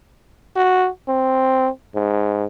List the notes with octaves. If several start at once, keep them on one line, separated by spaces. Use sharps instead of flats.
F#4
C4
G#2